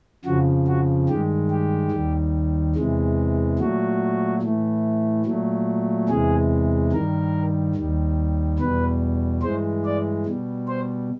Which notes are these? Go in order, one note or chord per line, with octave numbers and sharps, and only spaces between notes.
F2 C#3 F3 F#4
F#4
G2 D#3 G#3 G4
G4
D#2 D#3 G3
E2 C3 E3 G#3
A#2 F#3 A3 F#4
A2 E3 A3
A#2 F#3 A3
E2 C3 E3 G#3 G#4
G2 D#3 G3 A#4
D#2 D#3 G3
E2 B2 G3 B4
G2 E3 G#3 C5
D5
B2 G3
C5